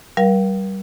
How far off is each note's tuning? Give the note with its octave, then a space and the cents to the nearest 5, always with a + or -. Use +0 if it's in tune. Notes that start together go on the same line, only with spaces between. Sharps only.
G3 -25 A#4 +40 F5 +0